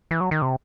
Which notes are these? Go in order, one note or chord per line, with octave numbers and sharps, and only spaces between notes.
E3
F#3
D#3
C3